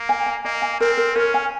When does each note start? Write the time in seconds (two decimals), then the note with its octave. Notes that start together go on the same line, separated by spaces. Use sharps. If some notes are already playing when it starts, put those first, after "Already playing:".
Already playing: A#3
0.09 G#5
0.26 G#5
0.45 A#3 D#5
0.62 G#5
0.80 C4 A#4
0.97 A#4
1.16 C#4 A#4
1.34 G#5